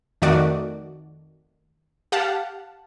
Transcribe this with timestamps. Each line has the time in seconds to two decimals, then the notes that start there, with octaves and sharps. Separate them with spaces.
0.22 F2 D#3 A3 F#4 D5
2.12 G4 F5 F#5 A5